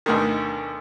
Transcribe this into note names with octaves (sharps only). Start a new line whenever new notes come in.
D2 B2 D3 D#3